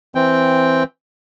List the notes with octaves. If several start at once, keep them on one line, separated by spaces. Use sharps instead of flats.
E3 C4 G5